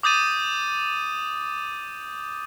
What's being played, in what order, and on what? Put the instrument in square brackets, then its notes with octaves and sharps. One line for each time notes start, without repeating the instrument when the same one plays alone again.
[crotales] D6 D#6 G6 A6 D#7